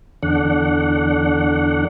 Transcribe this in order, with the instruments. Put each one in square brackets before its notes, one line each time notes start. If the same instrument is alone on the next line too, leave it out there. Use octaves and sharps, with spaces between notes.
[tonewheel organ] E2 D3 D4 F#5